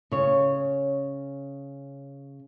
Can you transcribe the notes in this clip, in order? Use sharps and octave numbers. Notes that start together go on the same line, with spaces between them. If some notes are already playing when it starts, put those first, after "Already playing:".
C#3 C#5